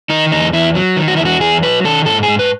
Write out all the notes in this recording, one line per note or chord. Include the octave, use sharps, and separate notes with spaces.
D#3 D#4
E2 D#4
E2 E4
F#3
D#3
F#4
E2 E4
F#4
E2 G#4
F#3 B4
D#3 A4
G#2 A4
G#4
G#2
B4